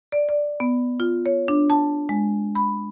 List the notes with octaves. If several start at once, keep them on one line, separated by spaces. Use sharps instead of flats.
D5
D5
B3
F4
C#5
D4
A5
G#3
B5